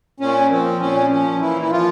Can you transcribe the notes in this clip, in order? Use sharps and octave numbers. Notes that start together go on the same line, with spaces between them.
A#2 C#4
F3 C4
A#2 C#4
F3 C#4
A#2 E3 E4
E4
F3 F4